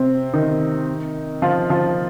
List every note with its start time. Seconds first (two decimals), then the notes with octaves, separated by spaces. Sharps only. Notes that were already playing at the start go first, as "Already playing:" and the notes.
Already playing: C3 C4
0.34 D#3 D#4
1.42 F3 F4
1.70 F3 F4